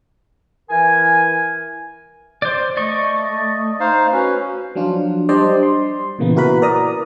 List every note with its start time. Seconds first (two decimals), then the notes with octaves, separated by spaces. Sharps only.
0.70 E3 A#4 G#5
2.42 C5 D5
2.77 A3 D5 D#5 C#6
3.80 D#4 C5 F5
4.12 C#4 F#4 B4
4.75 F3 F#3 D4 F4
5.29 G3 D4 C5 D5 D#5
5.63 C6
6.19 A#2 C#3 E3 A#3 B3
6.36 E4 F#4 A#4 B4 B5
6.62 A#4 D5 A#5 D#6